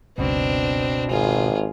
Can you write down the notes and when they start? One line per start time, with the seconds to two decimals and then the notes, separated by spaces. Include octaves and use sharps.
0.18 F#1 C#2 B2 C4 D4
1.11 G#1 F4 G#4